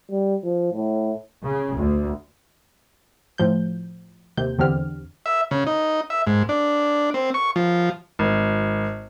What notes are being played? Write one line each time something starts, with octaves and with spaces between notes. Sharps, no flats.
G3
F3
A2
C#3
D2
A2 F3 G6
D#2 C3 G6
E2 D3 C4 G4 F6
E5
C#3
D#4
E5
G#2
D4
C4
C#6
F3
G#1